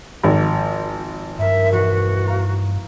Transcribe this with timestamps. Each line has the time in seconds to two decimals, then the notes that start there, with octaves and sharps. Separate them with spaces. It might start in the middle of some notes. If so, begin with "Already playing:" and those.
0.24 G#1 F3
1.39 G2 D#4 A#4 E5
1.72 E1 F#4 B4
2.27 F5 A#5